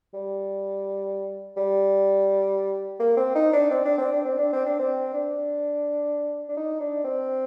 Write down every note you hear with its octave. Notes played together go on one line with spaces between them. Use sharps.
G3
G3
A#3
C4
D#4
D4
C4
D4
C4
D4
C4
D4
C4
D4
C4
D4
D4
D#4
D4
C4